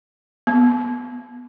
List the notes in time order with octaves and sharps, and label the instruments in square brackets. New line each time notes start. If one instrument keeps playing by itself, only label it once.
[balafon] B3